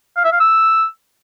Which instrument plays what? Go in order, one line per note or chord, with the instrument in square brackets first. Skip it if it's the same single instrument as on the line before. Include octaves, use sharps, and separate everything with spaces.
[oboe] F5
E5
F5
E6